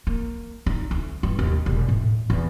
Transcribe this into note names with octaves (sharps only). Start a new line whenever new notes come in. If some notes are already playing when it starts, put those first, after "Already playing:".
A#3
D#4
D2
G2
D#2
E1
A2
E2